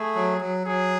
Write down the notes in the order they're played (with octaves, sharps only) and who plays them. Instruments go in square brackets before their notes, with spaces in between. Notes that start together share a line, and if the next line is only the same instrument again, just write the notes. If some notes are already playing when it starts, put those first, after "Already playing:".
Already playing: [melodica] A3 [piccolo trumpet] G#4
[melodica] F#3
F#3
[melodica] F#3 [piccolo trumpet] G#4